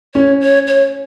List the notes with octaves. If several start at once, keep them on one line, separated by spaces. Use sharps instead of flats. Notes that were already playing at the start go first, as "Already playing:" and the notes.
C#4 C#5
C#5
C#5